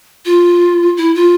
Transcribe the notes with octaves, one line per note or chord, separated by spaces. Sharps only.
F4
E4
F4